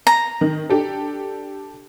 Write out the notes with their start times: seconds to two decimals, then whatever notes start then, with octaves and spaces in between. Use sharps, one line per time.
0.07 A#5
0.41 D#3
0.70 D4 G4 A4